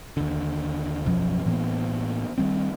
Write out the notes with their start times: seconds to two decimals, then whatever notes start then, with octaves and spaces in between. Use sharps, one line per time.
0.17 D#2 D3
1.05 E1 B1 F#2 F3
1.46 A2 E3 A#3 B3
2.38 D#3 G3 C4